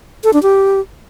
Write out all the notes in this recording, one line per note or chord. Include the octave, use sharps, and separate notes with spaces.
A4
D4
G4